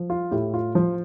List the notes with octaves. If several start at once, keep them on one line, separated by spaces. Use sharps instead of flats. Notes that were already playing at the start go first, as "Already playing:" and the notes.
Already playing: F3
F4
A2 E4 G4
F4
F3 F4